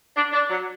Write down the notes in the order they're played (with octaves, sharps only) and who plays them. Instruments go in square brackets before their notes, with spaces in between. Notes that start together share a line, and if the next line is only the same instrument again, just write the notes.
[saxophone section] D4
D4
F#3